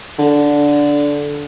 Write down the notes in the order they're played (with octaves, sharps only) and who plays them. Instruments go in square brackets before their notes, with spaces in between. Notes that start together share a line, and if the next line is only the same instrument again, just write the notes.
[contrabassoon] D3